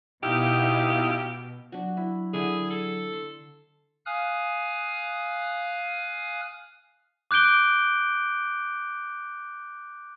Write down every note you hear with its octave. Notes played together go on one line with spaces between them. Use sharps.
B2 D#4 E4 G4 F5
F#3 D4 F#4
E4
D3 E4 G#4
A4
C6
F5 G#5 D#6 F6 F#6
D6 F#6 G6 D7 G7